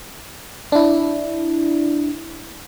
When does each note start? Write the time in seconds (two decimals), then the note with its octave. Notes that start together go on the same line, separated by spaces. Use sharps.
0.72 D4 E4